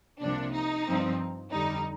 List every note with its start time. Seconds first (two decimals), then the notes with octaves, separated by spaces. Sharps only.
0.22 C2 C3 F3 A#3 D4
0.54 D#4
0.87 G2 F3 C4
1.51 F2 D3 G3 D#4